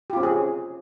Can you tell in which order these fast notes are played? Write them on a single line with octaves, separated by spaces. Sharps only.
G4 F4 C4 C#4 G#4